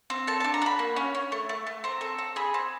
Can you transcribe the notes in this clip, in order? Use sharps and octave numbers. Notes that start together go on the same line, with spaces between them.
C4
A4 A5
D4 A5
A#5
F#4 B5
A#3
C#4
C#4
A3
A3
A3
C4 A#5
A4
C4
G#4 B5
C4